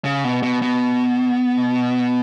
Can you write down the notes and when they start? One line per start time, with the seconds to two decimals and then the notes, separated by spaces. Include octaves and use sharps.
0.05 C#3
0.24 B2
0.43 B2
0.62 B2